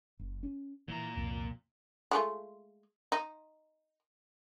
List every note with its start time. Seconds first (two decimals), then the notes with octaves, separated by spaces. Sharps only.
0.19 F#1
0.43 C#4
0.88 A#2 E3 A#5
1.16 C2 F2
2.11 G#3 A3 F4
3.12 D#4